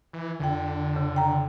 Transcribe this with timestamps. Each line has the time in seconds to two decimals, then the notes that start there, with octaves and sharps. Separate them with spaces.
0.13 E3
0.40 F2 D3 G5
0.96 C#3
1.16 G5 A#5